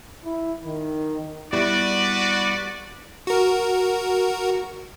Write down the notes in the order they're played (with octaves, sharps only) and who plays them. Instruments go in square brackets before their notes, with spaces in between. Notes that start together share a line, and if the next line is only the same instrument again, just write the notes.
[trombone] E4
D#3
[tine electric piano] G3 B3 E4 [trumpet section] F#4 B4 D5
[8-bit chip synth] F#4 A#4